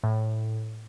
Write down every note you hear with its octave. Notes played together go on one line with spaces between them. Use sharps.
A2